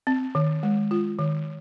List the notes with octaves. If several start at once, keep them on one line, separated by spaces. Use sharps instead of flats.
C4
D#3
G#3
F4
D#3